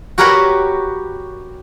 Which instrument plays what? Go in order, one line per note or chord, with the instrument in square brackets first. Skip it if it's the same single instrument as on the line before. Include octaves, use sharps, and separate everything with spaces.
[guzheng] F#4 G4 A#4 B4 C#5 F#5